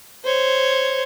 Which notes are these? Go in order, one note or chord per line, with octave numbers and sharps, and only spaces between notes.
C5 C#5